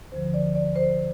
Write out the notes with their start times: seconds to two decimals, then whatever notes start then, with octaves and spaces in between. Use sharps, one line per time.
0.12 D2 D3 F3 C5
0.34 D5
0.55 D5
0.76 C5